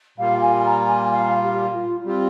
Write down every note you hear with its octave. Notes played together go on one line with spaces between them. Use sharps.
A#2 G3 A#3 F4 F5
G#5
A#5
G#5
F5
G4
F4
G3 C4 F4 G4